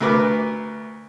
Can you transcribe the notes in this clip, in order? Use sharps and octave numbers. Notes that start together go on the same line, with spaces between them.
D2 A#4 B4 D6